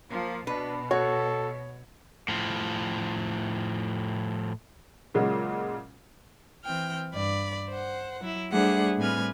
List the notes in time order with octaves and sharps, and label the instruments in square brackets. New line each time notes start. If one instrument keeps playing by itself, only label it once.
[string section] F3 [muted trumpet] A#3
[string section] B2 [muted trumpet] D4 [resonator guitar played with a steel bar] B4
[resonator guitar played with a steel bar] F#4 [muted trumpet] A4 [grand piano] C#5
[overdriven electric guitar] A2 F3
[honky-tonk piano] A#2 C#3 F#3 G#3 F4
[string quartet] E3 C4 G5 F6
G2 D5 B5
C5 F#5
F#3 E4
G3 A3 D4 G#4 C5 F#5
A2 G3 C4 B4 G#5 F6